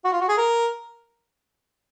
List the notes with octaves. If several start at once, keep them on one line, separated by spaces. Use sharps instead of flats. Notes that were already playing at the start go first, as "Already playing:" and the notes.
F#4
F4
F#4
G#4
A#4